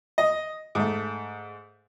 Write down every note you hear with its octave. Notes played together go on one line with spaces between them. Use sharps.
D#5
G#2 A3